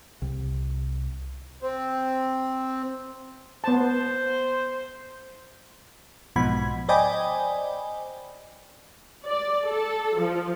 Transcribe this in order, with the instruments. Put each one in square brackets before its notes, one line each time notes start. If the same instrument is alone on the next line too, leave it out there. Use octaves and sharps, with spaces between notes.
[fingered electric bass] C2
[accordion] C4
[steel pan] B3 A5 [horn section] C5
[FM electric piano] B1 G#2 B2 F3 B5 G#6
C5 D5 D#5 G5 G#5 B5
[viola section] D5
A4
F3